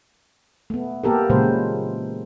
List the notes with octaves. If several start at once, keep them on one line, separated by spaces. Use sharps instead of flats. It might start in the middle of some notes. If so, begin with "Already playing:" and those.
A3 B3
A#3 B3 G4 A4 A#4
A#2 C#3 E3 G#3 B4 C5